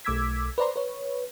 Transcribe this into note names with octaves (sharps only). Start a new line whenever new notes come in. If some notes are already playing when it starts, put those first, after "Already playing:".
B1 A3 D6 E6 G#6 B6
B4 C5 D5 A#5 C6
B4 C#5